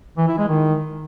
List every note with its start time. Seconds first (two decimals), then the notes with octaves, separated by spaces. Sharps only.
0.17 E3
0.28 E4
0.38 G#3
0.49 D#3